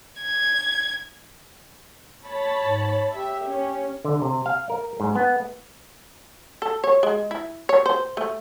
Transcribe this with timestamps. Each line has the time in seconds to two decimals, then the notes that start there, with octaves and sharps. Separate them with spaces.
0.22 G#6
2.26 C#5 A5 B5
2.62 G#2
3.13 G4 E5
3.46 C#4
4.05 D3
4.22 C3
4.46 F5
4.70 A#4
5.00 G#2
5.15 B3
6.62 A4
6.84 C#5
7.03 G#3
7.31 E4
7.69 C#5
7.86 C5
8.17 A3